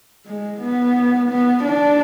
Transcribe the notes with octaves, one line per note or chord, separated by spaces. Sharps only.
G#3
B3
B3
D4